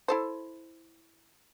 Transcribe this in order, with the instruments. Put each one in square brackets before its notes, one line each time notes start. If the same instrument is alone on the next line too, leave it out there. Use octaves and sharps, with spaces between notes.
[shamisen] E4 A4 C5